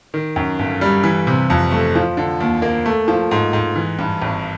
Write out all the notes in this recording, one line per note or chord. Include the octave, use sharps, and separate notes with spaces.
D#3
F#2
G1
G3
E3
C3
F2
A3
F3
D3
D#2
A#3
A3
F3
G#2
G#2
E3
G2
G#1